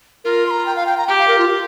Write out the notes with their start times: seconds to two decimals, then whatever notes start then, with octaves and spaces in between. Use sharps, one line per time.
0.24 F4 A#4
0.46 C6
0.51 A#5
0.66 G5
0.76 F5
0.86 G5
0.97 A#5
1.07 G4 G5
1.18 F5
1.28 A#4
1.38 F4
1.48 G4